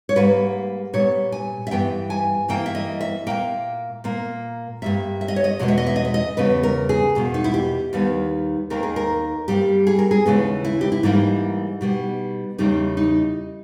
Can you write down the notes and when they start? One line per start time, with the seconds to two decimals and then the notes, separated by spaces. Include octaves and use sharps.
0.09 C#5
0.16 G#2 G3 A#3 B4
0.93 A#2 G3 B3 C#5
1.32 G#5
1.67 E5
1.71 G2 E3 G3 B3 G5
2.10 G#5
2.48 G2 E3 A#3 G5
2.66 E5
2.75 D#5
3.01 E5
3.27 A#2 A#3 G5
4.04 A#2 A#3
4.82 G2 G3 A#3 E5
5.21 E5
5.28 D#5
5.36 C#5
5.44 D#5
5.59 E2 B2 G#3 B3 D#5
5.68 E5
5.78 D#5
5.87 E5
5.96 D#5
6.05 E5
6.14 D#5
6.37 E2 C#3 G3 B3 B4
6.63 A#4
6.89 G#4
7.15 E2 B2 A#3
7.34 D#4
7.44 E4
7.54 G4
7.93 D#2 D#3 G3 B3
8.70 D#2 D#3 A#3 A#4
8.83 G#4
8.96 A#4
9.48 G2 G3 A#3 G4
9.87 G#4
9.99 A#4
10.11 G#4
10.26 D#2 C#3 E3 G#3 B3
10.65 E4
10.81 G4
10.92 E4
11.03 G#2 E3 G3 A#3 D#4
11.81 B2 G3 B3
12.58 E2 C#3 G3 A#3 D#4
12.97 D#4